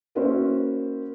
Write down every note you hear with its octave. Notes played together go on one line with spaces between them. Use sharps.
A#3 C#4 E4 F#4 A#4 C5